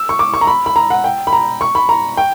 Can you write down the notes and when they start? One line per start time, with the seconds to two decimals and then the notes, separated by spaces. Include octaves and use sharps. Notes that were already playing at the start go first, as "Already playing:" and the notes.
Already playing: E6
0.09 C#6
0.19 D6
0.34 C#6
0.41 A#5
0.47 B5
0.66 B5
0.76 A#5
0.90 F#5
1.04 G5
1.27 B5
1.33 A#5
1.61 C#6
1.75 B5
1.89 A#5
2.17 G5